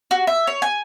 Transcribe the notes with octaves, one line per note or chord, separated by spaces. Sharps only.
F#4
E5
C#5
G#5